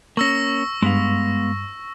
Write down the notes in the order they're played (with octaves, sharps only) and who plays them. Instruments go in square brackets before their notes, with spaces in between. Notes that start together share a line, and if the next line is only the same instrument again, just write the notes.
[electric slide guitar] A#3 C#4 [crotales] C#6 E6 A#6
[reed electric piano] G2 [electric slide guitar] G#3 B3 F5